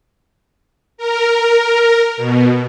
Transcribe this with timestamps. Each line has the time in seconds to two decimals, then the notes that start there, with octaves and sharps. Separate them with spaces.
0.98 A#4
2.17 B2